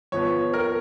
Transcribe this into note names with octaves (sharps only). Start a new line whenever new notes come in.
F2 F3 B3 C#5
A#4